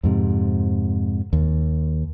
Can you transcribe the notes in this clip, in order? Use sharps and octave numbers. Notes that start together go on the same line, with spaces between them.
F2 G#2 C3
D#2